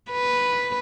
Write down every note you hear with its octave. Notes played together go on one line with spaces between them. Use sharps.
B4